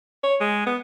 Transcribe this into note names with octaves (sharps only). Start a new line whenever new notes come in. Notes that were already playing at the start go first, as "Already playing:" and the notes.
C#5
G#3
B3